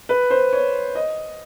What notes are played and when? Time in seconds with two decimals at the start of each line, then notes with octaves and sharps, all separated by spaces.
0.09 B4
0.30 C5
0.53 C#5
0.95 D#5